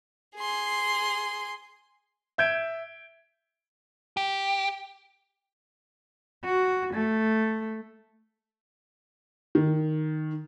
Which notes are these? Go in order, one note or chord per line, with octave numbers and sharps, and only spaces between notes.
G#4 C6
E5 G6 G#6 D7
G4
F#4
A3
D#3